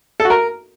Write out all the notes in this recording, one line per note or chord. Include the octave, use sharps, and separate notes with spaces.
A4
F#4
A#4